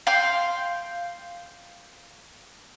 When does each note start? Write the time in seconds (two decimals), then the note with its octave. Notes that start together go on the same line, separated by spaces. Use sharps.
0.07 F5 G5 C6